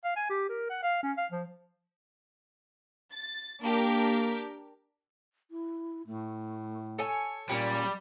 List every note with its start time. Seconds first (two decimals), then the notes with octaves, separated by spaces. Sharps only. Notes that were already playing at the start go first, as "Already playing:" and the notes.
0.04 F5
0.16 G#5
0.30 G4
0.49 A#4
0.70 F#5
0.83 F5
1.03 C#4
1.18 F5
1.32 F3
3.13 A6
3.62 A#3 D4 G4 A#4
5.51 E4
6.07 A2 A3
6.98 A4 C#5 G#5
7.49 A#2 G3 A#3 C#4 G4 D5